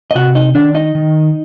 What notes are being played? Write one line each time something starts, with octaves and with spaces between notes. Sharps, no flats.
D#5
C3 F#4 F#5
D#4 D#5
D#3 D4 D5
D#4 D#5
D#3